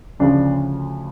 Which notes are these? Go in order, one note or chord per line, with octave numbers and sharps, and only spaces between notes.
D2 C#3 F3 D4